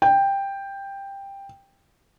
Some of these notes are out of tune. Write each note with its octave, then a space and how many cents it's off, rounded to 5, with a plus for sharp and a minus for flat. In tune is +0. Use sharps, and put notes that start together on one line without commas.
G5 +10